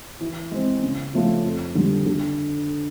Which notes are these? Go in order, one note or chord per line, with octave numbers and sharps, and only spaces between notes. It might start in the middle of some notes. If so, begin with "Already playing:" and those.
E3
G#3 C4
C#3
F3 A3 C#4 F4
F2
D3 G3
D3